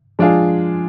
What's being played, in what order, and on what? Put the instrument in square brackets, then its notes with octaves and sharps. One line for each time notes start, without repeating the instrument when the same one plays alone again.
[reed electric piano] F3 [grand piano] G#3 D4 F4 G#4